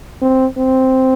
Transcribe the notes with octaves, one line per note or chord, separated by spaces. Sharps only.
C4
C4